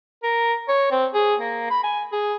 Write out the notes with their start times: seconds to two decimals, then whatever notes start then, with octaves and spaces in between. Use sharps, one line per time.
0.23 A#4
0.68 C#5
0.91 C4
1.14 G#4
1.40 A#3
1.70 B5
1.83 G#5
2.12 G#4